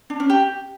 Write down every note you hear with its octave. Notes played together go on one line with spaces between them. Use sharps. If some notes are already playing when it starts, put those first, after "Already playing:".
D4
C#4
G4